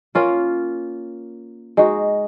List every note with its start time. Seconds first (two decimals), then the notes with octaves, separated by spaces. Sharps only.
0.15 A#3 C#4 F4 A#4
1.77 G#3 D#4 F#4